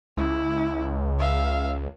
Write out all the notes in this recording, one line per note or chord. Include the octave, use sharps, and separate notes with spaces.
C#2 E4
E5 F5